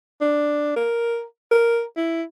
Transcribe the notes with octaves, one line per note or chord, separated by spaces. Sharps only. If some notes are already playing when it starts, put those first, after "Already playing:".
D4
A#4
A#4
E4